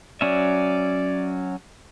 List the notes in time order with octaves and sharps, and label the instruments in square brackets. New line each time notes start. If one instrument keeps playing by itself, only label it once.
[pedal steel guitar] F#3 C#4 E5 [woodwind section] D5